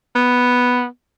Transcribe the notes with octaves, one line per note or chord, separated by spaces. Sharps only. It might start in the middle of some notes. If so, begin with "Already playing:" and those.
B3